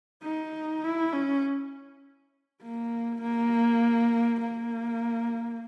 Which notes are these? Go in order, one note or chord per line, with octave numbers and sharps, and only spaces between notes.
D#4
E4
C#4
A#3
A#3
A#3